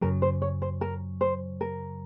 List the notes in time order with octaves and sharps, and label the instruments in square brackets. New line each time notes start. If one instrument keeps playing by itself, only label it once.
[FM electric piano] F#2 C#3 F#3 [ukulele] A#4
[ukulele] C5
C#5
C5
A#4
C5
A#4